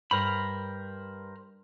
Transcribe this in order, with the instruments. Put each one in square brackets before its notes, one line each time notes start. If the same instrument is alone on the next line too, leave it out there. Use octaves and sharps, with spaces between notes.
[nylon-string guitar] G2 [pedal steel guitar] A#4 C5 B5